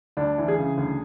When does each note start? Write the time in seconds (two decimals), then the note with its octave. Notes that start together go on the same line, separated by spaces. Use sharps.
0.17 D2 D4
0.38 E3
0.48 G#4
0.58 C#3
0.77 D2